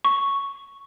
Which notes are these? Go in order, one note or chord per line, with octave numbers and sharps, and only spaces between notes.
C#6